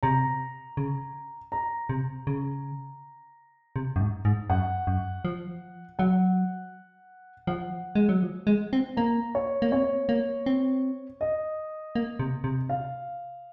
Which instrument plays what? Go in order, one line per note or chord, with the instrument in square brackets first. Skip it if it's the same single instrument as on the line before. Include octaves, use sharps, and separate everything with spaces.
[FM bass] C3 [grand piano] A#5
[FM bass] C#3
[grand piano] A#5
[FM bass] C3
C#3
C3
F#2
G#2
G#2
[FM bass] F#2 [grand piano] F#5
[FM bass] F#2
F3
[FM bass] F#3 [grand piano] F#5
[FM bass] F3 [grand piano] F#5
[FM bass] G#3
F#3
F3
G#3
C4
[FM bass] A#3 [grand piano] A#5
[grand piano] C#5
[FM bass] A#3
[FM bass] C4 [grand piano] C#5
[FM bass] A#3
C4
[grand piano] D#5
[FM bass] A#3
C3
C3
[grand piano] F5